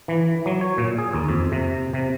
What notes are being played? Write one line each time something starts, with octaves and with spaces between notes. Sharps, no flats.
E3
F#3
C#5
A#2
G#4
D#2
F2
C3
C3